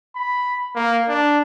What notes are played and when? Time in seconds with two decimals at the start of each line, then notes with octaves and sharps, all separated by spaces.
0.16 B5
0.75 A#3
1.08 D4